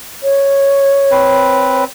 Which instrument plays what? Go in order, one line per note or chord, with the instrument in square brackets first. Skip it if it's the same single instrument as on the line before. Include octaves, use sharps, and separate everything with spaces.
[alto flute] C#5
[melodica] C4 B4